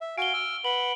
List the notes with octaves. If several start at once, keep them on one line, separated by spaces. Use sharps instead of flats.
E5
F#4 F5 G#5 D7 G7
E6 F6
B4 F#5 B5 F#7